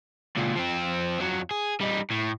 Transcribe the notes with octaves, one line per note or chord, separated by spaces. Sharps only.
C#2 A#2
F3 C4
F2 F#3
G#4
G3 D#4
A2